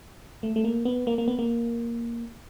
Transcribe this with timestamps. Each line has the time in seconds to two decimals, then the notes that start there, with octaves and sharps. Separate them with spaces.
0.43 A3
0.56 A3
0.64 A#3
0.85 B3
1.07 A#3
1.18 A#3
1.28 B3
1.39 A#3